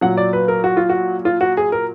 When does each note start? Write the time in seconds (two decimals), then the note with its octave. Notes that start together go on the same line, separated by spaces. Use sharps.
0.01 A#2 F#3 F#5
0.17 D5
0.33 B4
0.48 A#4
0.64 F#4
0.77 F4
0.89 F#4
1.25 F4
1.41 F#4
1.57 G#4
1.72 A#4